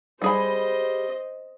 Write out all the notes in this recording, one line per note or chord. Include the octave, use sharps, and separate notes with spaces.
G3 G#4 C5 D#5 B5